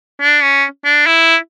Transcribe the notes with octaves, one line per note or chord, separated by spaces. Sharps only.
D4
C#4
D4
E4